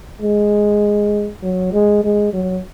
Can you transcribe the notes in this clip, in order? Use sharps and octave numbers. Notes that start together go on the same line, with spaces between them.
G#3
F#3
G#3
G#3
F#3